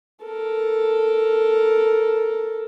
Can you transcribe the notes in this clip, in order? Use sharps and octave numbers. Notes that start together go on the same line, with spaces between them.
A4 A#4